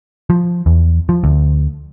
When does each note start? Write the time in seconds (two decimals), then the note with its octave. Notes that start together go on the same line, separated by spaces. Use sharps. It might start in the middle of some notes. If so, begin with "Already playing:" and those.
0.30 F3
0.66 E2
1.09 F3
1.24 D2